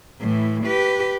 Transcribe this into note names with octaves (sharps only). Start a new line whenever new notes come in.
A2 E3
G4 B4